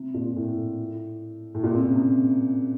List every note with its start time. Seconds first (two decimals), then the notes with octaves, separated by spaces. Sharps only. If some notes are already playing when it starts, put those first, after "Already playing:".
Already playing: C3
0.14 A#2
0.36 A2
1.54 A2
1.63 A#2
1.74 C3
1.84 C#3
1.95 C3